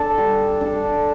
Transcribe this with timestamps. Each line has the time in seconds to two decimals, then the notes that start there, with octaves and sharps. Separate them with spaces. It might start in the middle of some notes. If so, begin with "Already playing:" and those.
Already playing: D4 A4
0.18 G3
0.61 D4 A4